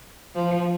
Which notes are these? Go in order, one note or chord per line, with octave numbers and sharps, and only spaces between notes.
F3